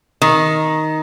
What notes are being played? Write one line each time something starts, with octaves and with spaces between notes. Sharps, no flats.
D#3